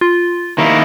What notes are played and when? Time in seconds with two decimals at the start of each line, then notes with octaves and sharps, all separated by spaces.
0.01 F4
0.58 D#3 A#3 E4